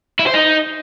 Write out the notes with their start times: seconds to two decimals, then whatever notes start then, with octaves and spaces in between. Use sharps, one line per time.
0.19 E4
0.27 C5
0.34 D#4